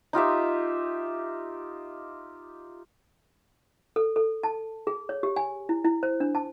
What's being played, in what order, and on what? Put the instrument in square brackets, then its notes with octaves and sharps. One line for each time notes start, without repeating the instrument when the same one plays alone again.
[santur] D#4 F4 G4 E5
[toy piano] A4
A4
A5
G#4
C#5
G4
G#5
E4
E4
C5
D4
A5